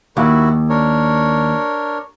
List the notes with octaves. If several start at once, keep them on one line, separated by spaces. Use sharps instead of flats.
D#2 D#3 E4 F#4
D4 A#4 C#5